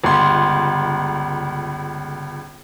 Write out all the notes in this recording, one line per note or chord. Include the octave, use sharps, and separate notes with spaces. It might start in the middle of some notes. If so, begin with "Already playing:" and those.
G1 C#2 C6